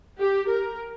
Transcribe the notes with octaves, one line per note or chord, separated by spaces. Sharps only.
G4
A#4